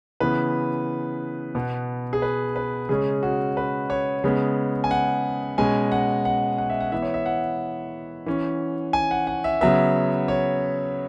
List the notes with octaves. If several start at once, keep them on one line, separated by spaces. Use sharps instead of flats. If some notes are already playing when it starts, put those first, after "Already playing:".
C#3 E3 B3 B4
B2 B3
G#4
B4
B4
C#3 G#3 C#4 G#4
F#4
B4
C#5
C#3 G#3 B3
G#5
F#5
B2 G#3 C#4 G#5
F#5
F#5
F#5
E5
F#5
E3 B3 E5
C#5
E5
F#5
E3 C#4
G#5
F#5
F#5
E5
C#3 F#3 B3 E5
C#5